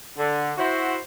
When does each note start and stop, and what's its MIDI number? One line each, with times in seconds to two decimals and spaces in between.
0.18 0.51 50
0.57 0.97 64
0.57 0.97 66
0.57 0.97 72